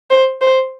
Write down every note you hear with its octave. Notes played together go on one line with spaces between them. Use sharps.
C5
C5